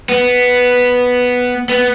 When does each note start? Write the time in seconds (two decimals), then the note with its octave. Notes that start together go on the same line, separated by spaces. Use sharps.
0.09 B3
1.69 B3